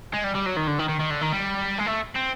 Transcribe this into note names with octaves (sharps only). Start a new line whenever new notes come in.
G#3
G3
G3
F#3
D#3
D3
D#3
D#3
D#3
D3
D#3
G3
G#3
A3
C4